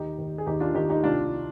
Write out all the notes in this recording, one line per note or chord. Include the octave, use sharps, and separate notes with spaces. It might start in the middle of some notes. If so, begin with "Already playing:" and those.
Already playing: D#2 D#4 G4
D#2
G#4
D#2 D#4 G4
D4 F4
D#2 D#4 G4
D#4 G4
C2 D4 F4